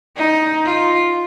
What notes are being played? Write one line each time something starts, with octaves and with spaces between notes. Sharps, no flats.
D#4
F4